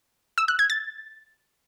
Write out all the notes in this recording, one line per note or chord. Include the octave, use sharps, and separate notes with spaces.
E6
F#6
G#6
A6